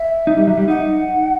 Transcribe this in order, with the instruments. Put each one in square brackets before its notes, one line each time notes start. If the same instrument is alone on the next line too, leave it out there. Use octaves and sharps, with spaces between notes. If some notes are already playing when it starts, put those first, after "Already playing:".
Already playing: [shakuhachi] E5
[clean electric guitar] D#4
G3
F#3
G3
[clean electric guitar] D#4 [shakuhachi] F#5